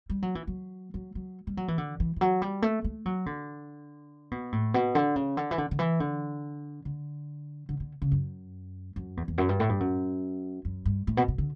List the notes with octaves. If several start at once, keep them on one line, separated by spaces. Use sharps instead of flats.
G3
F#3
E3
F#3
F#3
F#3
G3
F#3
E3
D3
E3
E3
F#3
G3
A3
A3
F#3
D3
B2
A2
B2
D3
C#3
D3
E3
D3
D3
E3
D3
D3
D3
D3
C#3
F#2
F#2
E2
E2
F#2
G2
A2
G2
F#2
F#2
G2
A2
B2
B2
D3